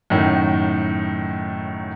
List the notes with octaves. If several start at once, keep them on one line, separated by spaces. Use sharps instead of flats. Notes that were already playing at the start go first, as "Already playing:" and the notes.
F#2 A2 D#3